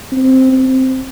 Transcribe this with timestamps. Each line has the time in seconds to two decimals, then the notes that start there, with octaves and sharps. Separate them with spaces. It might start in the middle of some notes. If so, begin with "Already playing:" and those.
0.12 C4
0.52 C4